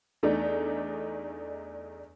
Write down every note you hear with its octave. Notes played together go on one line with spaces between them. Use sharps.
E2 A3 D4 D#4